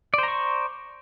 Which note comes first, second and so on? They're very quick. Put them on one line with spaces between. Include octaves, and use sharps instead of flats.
D5 C5 A#5 C#6